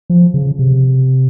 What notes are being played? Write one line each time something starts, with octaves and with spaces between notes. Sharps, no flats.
F3
C#3
C3